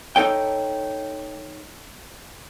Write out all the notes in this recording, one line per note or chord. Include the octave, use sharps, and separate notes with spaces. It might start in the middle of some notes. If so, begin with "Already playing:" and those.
D#4 A4 C#5 G5